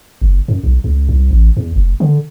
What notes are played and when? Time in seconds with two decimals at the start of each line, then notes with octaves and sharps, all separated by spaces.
0.22 F#1
0.48 F#2
0.64 B1
0.84 C#2
1.09 C2
1.31 A1
1.57 E2
1.76 F1
2.00 D3